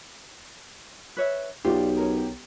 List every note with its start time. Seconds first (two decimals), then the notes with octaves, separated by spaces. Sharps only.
1.17 B4 C#5 E5
1.65 B1 B3 F4 G4 D5
1.97 C#4 A#4